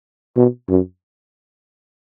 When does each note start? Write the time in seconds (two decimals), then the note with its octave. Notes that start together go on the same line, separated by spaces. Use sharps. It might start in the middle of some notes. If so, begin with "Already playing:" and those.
0.37 B2
0.69 F#2